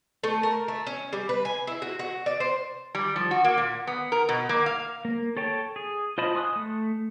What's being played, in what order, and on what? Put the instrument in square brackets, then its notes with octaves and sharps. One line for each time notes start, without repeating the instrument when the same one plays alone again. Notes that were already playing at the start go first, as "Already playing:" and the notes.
[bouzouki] A3
A#4
A3
C#4
G3
B4
G#5
E4
F#4
F#4
D5
C5
[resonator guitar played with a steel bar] G3
F3
F#4
A#3
A#2
B3
A#4
B2
A#3
F5
[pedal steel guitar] A#3
A4 C#5 G5 A5
G#4
F4 C5 D#5 A5 B5
G#5 C6 D#6 F6 F#6
A3